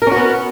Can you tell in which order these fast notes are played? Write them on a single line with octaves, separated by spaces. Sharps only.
A#4 C#4 F#4 B3